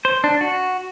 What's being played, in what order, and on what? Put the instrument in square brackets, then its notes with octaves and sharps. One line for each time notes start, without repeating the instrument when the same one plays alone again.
[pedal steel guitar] C5
D4
F#4